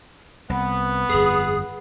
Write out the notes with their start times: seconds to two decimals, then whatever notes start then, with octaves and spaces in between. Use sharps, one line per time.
0.50 C2 B3
1.09 G1 F2 G#4